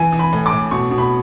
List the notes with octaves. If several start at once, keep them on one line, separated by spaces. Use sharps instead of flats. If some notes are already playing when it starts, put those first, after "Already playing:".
Already playing: E3 G#5
E3
B5
A2
D6
A2
B2 C#6
B2
B5